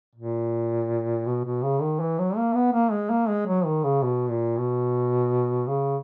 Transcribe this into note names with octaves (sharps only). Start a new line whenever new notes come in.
A#2
B2
B2
C#3
D#3
E3
F#3
A#3
B3
A#3
G#3
A#3
G#3
F#3
D#3
C#3
B2
A#2
B2
C#3